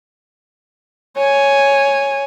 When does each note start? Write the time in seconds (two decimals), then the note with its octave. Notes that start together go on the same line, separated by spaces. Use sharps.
1.17 C#5 G#5